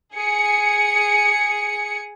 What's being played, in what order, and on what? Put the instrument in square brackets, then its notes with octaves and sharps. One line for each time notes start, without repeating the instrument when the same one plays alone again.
[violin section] G#4 C#7